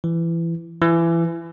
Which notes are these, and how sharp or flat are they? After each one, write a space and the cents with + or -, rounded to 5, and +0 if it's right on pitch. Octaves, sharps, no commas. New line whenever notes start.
E3 +20
E3 +25